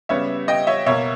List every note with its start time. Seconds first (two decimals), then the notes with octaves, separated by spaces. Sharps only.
0.09 C#3 G3 B3 C#5 E5
0.48 D#5 G5
0.67 C#5 E5
0.86 B2 A#3 C#5 E5